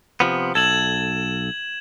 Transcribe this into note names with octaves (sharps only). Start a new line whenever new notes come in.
C3 F3 B3
B1 A4 G#6 E7 F#7